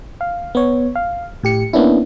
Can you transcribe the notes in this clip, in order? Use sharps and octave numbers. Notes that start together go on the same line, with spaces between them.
F5
B3 C#5
F5
A2 G4 C#7
A#3 B3 C#4 D4 E4